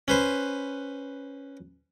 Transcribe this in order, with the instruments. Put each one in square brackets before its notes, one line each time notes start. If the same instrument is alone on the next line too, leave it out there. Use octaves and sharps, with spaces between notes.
[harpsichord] C#4 B4 C5